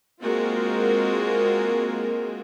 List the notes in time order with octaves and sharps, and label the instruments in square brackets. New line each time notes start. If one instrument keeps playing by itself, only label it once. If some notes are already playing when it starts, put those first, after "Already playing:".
[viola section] G#3 A#3 C4 F4 F#4 A#4